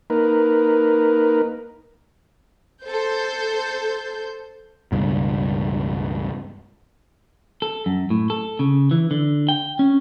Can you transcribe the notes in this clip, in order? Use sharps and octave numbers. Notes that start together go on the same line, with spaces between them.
A#3 D#4 A#4 B4
A4 C5 G6
C#2 G2 B2
A4
F#2
A2
A4
C#3
E3
D3
G5
C#4